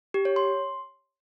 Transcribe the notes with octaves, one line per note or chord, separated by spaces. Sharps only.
G4
C#5
C6